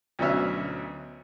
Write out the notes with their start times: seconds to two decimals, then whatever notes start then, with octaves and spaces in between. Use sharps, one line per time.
0.19 D2 B2 F#3 C#4 E5 F6